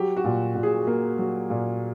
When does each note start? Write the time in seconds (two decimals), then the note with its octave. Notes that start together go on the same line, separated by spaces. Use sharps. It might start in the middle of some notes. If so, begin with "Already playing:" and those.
Already playing: F#3 G4
0.17 F#4
0.24 A#2
0.56 A#2
0.63 G#4
0.87 A#3
1.18 F#3
1.50 A#2